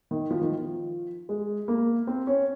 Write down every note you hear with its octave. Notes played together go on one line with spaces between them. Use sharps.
D#3
F3
D#3
F3
G#3
A#3
C4
C#4